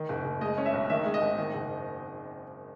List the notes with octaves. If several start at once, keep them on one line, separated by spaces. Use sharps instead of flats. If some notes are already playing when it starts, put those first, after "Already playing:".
Already playing: D#3
F#1
F#1
G#3 D#5
C#4
E5
B1
D#3 E5
G#3
D#5
G#1
D#3
F#1